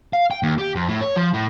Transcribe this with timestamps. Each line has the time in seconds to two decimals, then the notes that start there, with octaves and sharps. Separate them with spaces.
0.13 F5
0.31 G5
0.43 D#2
0.58 G4
0.75 F2
0.88 A2
1.01 C#5
1.17 F3
1.34 A2